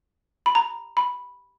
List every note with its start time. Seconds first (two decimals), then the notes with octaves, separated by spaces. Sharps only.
0.46 B5
0.55 A#5
0.97 B5